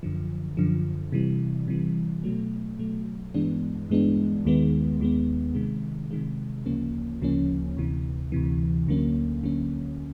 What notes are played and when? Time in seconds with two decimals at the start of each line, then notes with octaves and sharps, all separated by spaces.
0.03 F#2 D3 F3
0.57 F#2 D3 F3
1.12 C3 E3 G3
1.68 C3 E3 G3
2.24 B2 F#3 A3
2.79 B2 F#3 A3
3.34 G2 E3 G#3 B3 D4
3.90 G2 E3 G#3 B3 D4
4.45 D#2 D#3 G#3 B3
5.00 D#2 D#3 G#3 B3
5.55 C3 D#3 G#3
6.11 C3 D#3 G#3
6.66 D2 C#3 F3 A#3 C#4
7.21 D2 C#3 F3 A#3 C#4
7.77 D2 C3 E3
8.32 D2 C3 E3
8.88 D2 D3 F#3 A#3 C#4
9.43 D2 D3 F#3 A#3 C#4